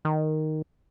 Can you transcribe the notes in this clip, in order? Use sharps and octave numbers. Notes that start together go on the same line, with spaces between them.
D#3